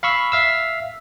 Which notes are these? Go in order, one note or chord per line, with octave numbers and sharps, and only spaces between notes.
F5 B5 C#6 E6
E5 F5 E6